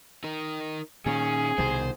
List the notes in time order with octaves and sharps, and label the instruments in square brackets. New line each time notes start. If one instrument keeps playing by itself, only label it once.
[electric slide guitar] D#4 A#4
[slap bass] A#2 D#3 [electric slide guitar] C#4 [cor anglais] G#4
[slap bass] C2 B2 D#3 [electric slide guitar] C5